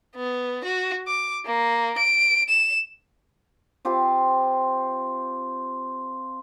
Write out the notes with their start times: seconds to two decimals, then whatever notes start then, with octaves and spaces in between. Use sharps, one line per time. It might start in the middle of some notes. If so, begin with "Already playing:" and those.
0.16 B3
0.65 F#4
1.08 D6
1.45 A#3
1.98 D7
2.49 E7
3.85 C4 F4 G4 C5